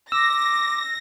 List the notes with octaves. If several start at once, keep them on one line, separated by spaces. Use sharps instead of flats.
D6 E6 A#6